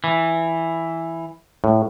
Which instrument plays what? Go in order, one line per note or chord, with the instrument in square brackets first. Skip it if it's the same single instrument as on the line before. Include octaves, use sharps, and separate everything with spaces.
[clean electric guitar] E3
[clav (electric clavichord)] A2